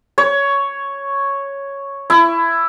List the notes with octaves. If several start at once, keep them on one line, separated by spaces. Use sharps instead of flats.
C#5
E4